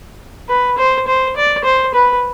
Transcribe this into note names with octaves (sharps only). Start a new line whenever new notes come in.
B4
C5
C5
D5
C5
B4